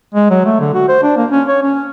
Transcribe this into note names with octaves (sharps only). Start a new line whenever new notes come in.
G#3
F#3
A3
D3
F#4
C5
D4
A#3
C#4
C#5
C#4